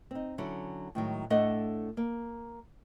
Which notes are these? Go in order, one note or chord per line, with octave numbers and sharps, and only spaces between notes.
C4 D#4
D3 F#3 C#4 E4
A2 D#3 F#3 G#3
A2 A3 D4 A4 D#5 F#5
A#3